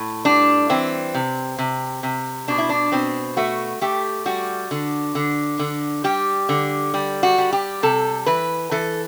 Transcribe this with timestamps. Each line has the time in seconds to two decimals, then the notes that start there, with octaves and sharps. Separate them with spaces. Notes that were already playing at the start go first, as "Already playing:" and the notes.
Already playing: A2
0.25 G3 D4
0.69 E3 C4
1.15 C3
1.58 C3
2.03 C3
2.48 B2 D4
2.58 E4
2.69 D4
2.92 B2 C4
3.37 A3 F#4
3.81 A3 G4
4.26 G3 F#4
4.71 D3
5.15 D3
5.59 D3
6.04 G3 G4
6.49 D3
6.94 G3
7.23 F#4
7.38 G3
7.53 G4
7.83 C3 A4
8.26 E3 B4
8.71 E3 A4